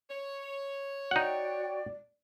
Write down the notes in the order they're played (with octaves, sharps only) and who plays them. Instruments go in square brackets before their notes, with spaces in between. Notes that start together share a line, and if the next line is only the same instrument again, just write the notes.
[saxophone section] C#5
[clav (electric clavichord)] D#4 F#5 [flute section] F#4 G5 [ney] D5